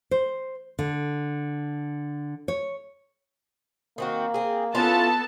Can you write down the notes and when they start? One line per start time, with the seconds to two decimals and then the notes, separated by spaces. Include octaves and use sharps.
0.11 C5
0.79 D3
2.48 C#5
3.98 D#3 A#3 C4 F#4
4.34 C4 G#4
4.75 B3 C#4 E4 F4 A4 A5